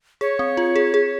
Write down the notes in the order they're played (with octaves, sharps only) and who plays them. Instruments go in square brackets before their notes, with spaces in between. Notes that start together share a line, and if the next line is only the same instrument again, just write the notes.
[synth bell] G#4 [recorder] C#5
[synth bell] C4
F4
G#4
G#4